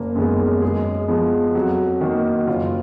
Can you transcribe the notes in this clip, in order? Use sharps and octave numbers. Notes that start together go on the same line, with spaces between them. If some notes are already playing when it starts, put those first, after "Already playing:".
Already playing: F#1 A#3 A#4
F#2 D#3 G#3 B3
F#2 G#3 G#4
F3 G#3 B3
F2 F#3 F#4
D#3 A#3
F#4
F#1 F4